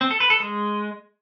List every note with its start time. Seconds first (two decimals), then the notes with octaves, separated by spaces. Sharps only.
0.01 C4
0.11 A4
0.20 B4
0.30 A4
0.40 G#3